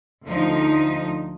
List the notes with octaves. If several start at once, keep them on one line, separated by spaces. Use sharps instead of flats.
D2 F3 D#4